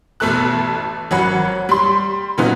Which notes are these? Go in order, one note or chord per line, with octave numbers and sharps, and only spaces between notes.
A1 B2 A3 A4 A5 F#6
G#1 F#3 C#4 F#5 B5
G3 C6
A#2 C#3 F#3 B3 D#4 F#4